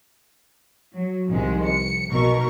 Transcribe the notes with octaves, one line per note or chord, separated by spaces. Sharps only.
F#3
C2 D#3 F3 G#3
C#7
B1 B2 A#4 C#6